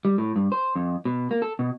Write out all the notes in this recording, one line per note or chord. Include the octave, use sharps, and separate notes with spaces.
G3
A2
G2
C5
F2
B2
A#3
A4
B2